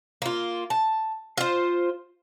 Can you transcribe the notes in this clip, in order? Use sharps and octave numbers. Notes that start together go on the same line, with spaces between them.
A#3 F4
A5
F4 C5